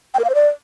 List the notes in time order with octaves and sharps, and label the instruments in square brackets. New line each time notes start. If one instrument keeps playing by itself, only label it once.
[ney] G5
A#4
F5
C5
D5